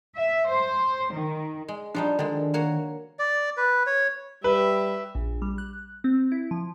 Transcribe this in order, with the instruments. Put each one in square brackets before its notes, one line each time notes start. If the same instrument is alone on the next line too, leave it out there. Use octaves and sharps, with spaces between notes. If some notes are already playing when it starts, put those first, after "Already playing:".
[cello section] E5
C5
D#3
[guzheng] G#3
[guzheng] F3 G3 D#4 [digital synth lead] D4
[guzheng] D3 G#3 [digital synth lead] D#3
[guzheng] A#3 F#4 C#5
[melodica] D5
B4
C#5
[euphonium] G3 [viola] G4 E5 [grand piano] B4
[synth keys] A#1
G3
F#6
C4
E4
F3